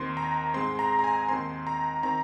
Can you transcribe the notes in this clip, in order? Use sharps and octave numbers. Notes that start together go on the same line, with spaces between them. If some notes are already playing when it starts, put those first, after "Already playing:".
Already playing: D#2 D#3 C4 C6
A#5
G#2 G#3 C4 C6
A#5
A#5
G#5
D#2 D#3 C4 C6
A#5
D#3 C4 A#5